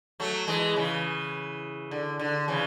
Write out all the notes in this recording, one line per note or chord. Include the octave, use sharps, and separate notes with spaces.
F#3 A3
E3 G#3
C#3 E3
D3
D3
C#3 E3